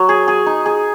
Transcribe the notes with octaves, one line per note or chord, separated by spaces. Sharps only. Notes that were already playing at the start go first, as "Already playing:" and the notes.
Already playing: F#3
G#4
G#4
D#4
G#4